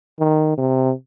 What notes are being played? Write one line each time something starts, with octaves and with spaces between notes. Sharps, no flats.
D#3
C3